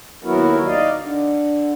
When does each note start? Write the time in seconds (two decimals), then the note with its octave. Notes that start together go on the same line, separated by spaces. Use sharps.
0.24 D#2 F#3 B3 E4 F#4 A#4
0.66 D#4 D5 D#5 F5
0.98 D3